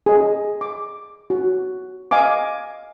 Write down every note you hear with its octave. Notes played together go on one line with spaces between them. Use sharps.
G#4 D#5
D6
F#4
D#5 F5 G#5 D6